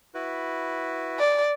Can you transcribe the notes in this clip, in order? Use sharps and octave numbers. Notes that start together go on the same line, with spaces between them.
E4 F#4 B4
D5